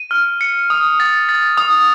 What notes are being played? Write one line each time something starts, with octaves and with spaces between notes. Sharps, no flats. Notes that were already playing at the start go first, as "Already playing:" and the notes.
Already playing: D#7
F6
C#7
D#6
A6
A6
D#6